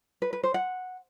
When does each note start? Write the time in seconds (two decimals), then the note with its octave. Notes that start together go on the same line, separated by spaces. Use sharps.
0.22 B4
0.33 B4
0.43 C5
0.54 F#5